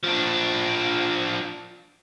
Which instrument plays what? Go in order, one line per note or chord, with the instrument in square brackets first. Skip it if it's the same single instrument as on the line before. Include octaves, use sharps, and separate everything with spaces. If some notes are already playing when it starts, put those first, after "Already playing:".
[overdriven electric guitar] F3 D4